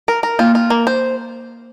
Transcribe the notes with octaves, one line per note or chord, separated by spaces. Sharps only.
A#4
A#4
A#3 F4
F4
A#3
C5